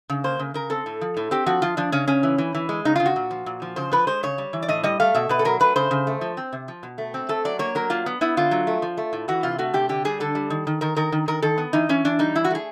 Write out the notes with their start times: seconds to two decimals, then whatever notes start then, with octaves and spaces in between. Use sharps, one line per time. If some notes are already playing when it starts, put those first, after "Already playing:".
0.10 C#3
0.24 A#3 C5
0.39 C#3
0.54 C#3 A#4
0.70 C4 A4
0.86 A2
1.01 F3
1.17 A2
1.31 C4 G4
1.46 F3 F#4
1.62 F3 F4
1.77 F3 D4
1.92 C#3 C#4
2.08 C#3 C#4
2.23 E3
2.38 E3
2.55 E3
2.69 G#3
2.85 C#3 D#4
2.96 C#3 F4
3.06 F#4
3.16 A#2
3.31 F3
3.46 A#2
3.62 F3
3.76 C#3 C5
3.92 F3 B4
4.07 G#3 C5
4.23 C#3 C#5
4.38 G3
4.53 E3
4.63 D5
4.68 A2 D#5
4.84 G3 D#5
5.00 A3 F5
5.15 B2 E5
5.29 B2 B4
5.39 A4
5.45 F#3 A#4
5.60 A3 B4
5.76 C#3 C5
5.91 C#3
6.07 A3
6.21 F3
6.37 C4
6.53 C3
6.68 F3
6.83 B2
6.98 A3
7.14 C4
7.29 A3 A4
7.45 F#3 D5
7.59 A#3 C#5
7.75 F#3 A#4
7.90 A#3 F4
8.06 B3
8.21 B3 E4
8.37 D3 F4
8.51 F#3
8.67 A3
8.82 F3
8.97 A3
9.13 A2
9.28 E3 F#4
9.43 C3 F4
9.59 A3 F#4
9.74 C3 G4
9.89 D3 G4
10.05 G3 G#4
10.20 D3 A4
10.35 G3
10.50 D#3
10.67 D#3
10.81 D#3 A#4
10.96 D#3 A#4
11.12 D#3
11.28 D#3 A#4
11.42 D#3 A4
11.58 B3
11.73 E3 D#4
11.89 E3 C#4
12.05 E3 D4
12.19 G3 D#4
12.35 E3 E4
12.45 F#4
12.51 A3 G#4